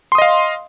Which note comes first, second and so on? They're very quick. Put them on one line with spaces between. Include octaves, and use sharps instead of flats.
C6 D#6 D#5 F5